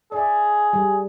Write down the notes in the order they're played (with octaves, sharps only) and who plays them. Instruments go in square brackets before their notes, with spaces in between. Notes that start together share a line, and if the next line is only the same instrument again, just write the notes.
[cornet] G#4 [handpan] D5 E5
[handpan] G3